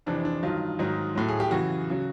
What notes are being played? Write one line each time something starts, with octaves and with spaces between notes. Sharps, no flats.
F2 C3 E3 D4
D4
G2 D#3 F#3 F4
G#2 D#3 F#3
A2 F#3
G#4
G4
F#2 C#3 E3 F#4
C#3 F#3